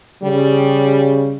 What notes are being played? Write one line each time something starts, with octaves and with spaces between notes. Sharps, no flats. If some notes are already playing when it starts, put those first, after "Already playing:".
C#3 G3